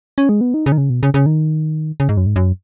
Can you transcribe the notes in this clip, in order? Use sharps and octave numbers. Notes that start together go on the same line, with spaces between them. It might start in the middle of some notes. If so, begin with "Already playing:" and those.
C#4
G#3
B3
D#4
C#3
D#3
C#3
B2
C#3
C#3
D#3
C#3
G#2
F#2
G#2
F#2